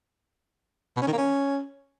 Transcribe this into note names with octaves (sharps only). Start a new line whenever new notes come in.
B2
C#4
D#3
A#3
C#4